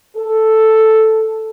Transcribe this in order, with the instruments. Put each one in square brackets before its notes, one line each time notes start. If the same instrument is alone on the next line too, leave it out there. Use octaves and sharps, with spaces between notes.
[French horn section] A4